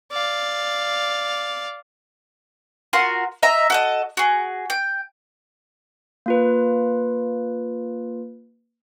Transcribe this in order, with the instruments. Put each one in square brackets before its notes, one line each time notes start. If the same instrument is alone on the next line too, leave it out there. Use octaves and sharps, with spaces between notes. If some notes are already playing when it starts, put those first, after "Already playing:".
[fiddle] D5 F5
[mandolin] F4 F#4 A#4 C6
D#5 E5 A#5
F#4 A4 D#5
F#4 G#4
G5
[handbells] A#3 F4 B4